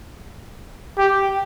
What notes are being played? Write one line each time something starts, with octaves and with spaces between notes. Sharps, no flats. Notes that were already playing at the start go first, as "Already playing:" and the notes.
G4